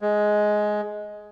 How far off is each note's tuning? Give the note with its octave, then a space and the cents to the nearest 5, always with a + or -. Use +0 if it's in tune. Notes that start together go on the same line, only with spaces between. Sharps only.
G#3 +10